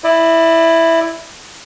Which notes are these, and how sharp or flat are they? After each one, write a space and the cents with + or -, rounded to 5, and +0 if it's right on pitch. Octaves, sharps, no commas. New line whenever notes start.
E4 +0 D5 +35